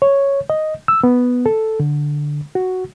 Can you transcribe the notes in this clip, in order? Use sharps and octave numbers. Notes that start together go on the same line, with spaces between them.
C#5
D#5
E6
B3
A4
D3
F#4